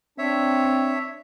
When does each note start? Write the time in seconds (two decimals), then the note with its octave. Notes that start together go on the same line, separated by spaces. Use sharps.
0.18 C4 D4 C#5 E5